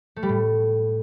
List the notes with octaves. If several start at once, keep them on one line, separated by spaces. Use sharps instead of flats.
A3
G3
A2